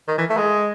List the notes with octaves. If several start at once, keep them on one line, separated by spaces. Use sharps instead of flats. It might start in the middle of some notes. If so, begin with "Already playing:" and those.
D#3
E3
A3
G#3